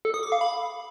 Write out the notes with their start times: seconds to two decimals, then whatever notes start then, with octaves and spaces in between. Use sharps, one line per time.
0.05 A4
0.14 D#6
0.23 D6
0.32 F5
0.41 B5